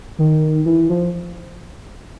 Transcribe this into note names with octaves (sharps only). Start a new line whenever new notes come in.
D#3
E3
F3